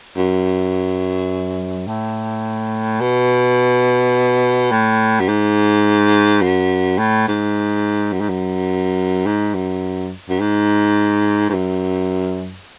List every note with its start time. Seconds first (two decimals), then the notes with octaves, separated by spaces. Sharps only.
0.17 F#2
1.87 A2
3.01 B2
4.71 A2
5.20 F#2
5.28 G#2
6.42 F#2
6.99 A2
7.28 G#2
8.13 F#2
8.21 G#2
8.29 F#2
9.26 G#2
9.55 F#2
10.29 F#2
10.40 G#2
11.49 G#2
11.54 F#2